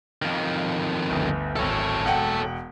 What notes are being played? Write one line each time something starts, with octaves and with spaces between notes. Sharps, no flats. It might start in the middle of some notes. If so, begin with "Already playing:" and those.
F2 D#3
G1 D2
D1 G#1 A4 C#5
E1 F#5 G5